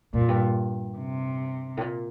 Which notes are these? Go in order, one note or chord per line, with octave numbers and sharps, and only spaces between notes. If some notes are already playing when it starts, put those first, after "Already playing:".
G2 A#2
F2
G2
C3
A2
A#2